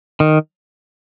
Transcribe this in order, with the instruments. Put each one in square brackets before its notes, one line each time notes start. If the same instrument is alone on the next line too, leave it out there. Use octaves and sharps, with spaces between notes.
[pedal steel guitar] D#3